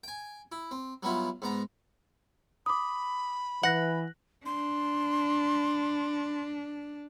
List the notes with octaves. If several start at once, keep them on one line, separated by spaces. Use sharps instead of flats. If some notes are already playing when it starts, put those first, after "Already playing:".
G5 G#5
E4
C4
F#3 G3 B3 E4 F4
G#2 B3 A#5
B5 D6 D#6
E3 F#5 F#6 A#6 F#7
D4 C6